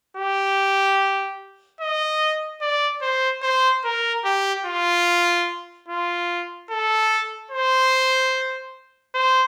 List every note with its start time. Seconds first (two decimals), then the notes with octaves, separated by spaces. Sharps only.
0.17 G4
1.80 D#5
2.61 D5
3.02 C5
3.43 C5
3.85 A#4
4.25 G4
4.65 F4
5.88 F4
6.70 A4
7.51 C5
9.14 C5